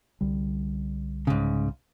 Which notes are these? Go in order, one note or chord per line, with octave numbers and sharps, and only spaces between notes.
C2 D3 G3
G#2 C#3